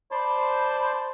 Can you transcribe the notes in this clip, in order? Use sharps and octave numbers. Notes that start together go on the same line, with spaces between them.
C5 D5 A5 B5 C6